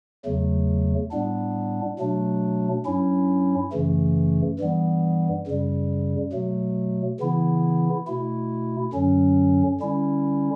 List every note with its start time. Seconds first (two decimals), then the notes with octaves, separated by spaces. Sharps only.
0.25 E2 C#3 F#3 A3
1.11 A2 G3 B3 D4
1.99 B2 F#3 A3 D4
2.85 G2 F#3 C#4 E4
3.72 F#2 C#3 E3 A3
4.59 G2 E3 G3 B3
5.47 F#2 C#3 G3
6.32 B2 F#3 A3
7.19 C#3 E3 B3 E4
8.06 B2 A3 E4
8.93 F#2 D3 F#3 C#4
9.80 D3 G3 C#4 E4